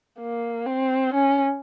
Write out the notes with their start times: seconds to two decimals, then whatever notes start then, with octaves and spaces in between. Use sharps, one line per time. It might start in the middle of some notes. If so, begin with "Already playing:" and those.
0.19 A#3
0.66 C4
1.14 C#4